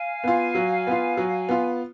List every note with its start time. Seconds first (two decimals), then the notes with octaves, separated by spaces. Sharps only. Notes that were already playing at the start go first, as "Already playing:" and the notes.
Already playing: F5 G#5
0.24 B3 F4
0.55 F#3
0.87 B3 F4
1.17 F#3
1.49 B3 F4